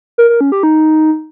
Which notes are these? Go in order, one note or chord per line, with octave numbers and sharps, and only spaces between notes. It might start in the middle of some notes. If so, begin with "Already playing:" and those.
A#4
A#4
C#4
G4
D#4